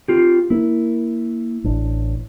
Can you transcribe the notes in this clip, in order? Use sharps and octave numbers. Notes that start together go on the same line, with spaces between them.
C4 F4 G4
A#3 E4
A1 D4